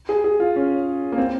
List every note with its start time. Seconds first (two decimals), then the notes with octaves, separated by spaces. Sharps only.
0.09 G#4
0.24 G#4
0.40 F4
0.56 C#4
1.12 A#3
1.18 C4